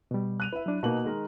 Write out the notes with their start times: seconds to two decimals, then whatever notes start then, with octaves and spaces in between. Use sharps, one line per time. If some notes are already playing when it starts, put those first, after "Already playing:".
0.11 B2 G3
0.40 F#6 D#7 F7
0.53 E4 B4 E5
0.66 F#3 D4
0.83 B2 A#3 D#4 F#4 F#7
1.04 D#3 G#3 A#4